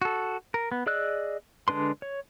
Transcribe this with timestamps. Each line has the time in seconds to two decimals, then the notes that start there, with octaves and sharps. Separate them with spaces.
0.02 F#4 A4
0.54 A#4
0.72 B3
0.86 G#4 D5 D#5 E6 F#6
1.68 D3 G#3 D4 B4 C6
2.02 C#5